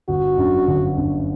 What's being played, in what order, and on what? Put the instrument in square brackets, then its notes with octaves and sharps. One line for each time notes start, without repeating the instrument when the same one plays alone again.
[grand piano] G1 [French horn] F#4
[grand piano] F#2 D3
G1
F#2 D3